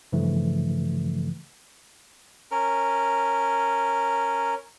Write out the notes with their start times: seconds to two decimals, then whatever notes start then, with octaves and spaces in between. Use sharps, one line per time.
0.12 G2 C#3 E3 F3 A3
2.51 C#4 A#4